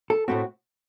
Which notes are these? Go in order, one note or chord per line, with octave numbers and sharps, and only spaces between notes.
A4
A2 A3 C4 F#4